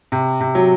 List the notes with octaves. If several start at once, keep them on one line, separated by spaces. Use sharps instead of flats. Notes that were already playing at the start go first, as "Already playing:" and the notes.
C3
C3
F#3